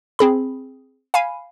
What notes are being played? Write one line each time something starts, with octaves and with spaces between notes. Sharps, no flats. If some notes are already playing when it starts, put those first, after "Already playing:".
C4 G#4 B5
F5 G#5 B5